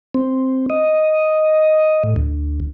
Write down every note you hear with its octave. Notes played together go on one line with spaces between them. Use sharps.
C4
D#5
A2
D2